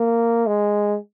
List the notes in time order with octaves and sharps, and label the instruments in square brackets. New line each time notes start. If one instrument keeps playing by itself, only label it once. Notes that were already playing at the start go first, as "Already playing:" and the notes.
Already playing: [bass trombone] A#3
G#3